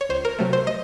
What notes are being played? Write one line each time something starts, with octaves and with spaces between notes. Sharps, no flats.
C#5
C#2 C5
A#4
C3 F#3 A3
C5
D#5